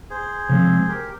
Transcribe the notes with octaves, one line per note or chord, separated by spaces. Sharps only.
G#4 C5
C3 F3 G#3 C4
G4 A#4